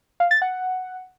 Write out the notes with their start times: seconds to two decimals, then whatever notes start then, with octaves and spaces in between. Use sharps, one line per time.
0.20 F5
0.31 A6
0.42 F#5